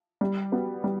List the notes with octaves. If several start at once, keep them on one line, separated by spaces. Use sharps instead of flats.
G3
B3 F#4
G3